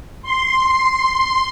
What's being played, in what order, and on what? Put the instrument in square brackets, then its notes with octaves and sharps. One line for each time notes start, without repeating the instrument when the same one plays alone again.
[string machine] C6